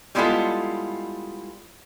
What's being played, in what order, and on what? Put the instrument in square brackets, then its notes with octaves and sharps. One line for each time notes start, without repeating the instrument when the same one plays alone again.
[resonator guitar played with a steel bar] G3 G#3 B3 E4 F4 A4